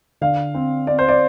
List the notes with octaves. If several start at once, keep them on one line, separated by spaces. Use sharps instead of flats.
D3 F5
C4
C4 D5
C5
D5